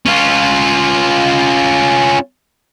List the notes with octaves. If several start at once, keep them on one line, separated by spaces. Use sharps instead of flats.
C#4 F4